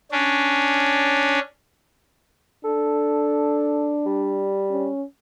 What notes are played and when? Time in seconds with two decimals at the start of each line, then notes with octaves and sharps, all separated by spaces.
0.11 C#4 D4
2.64 D4 A4
4.06 G3
4.70 C#4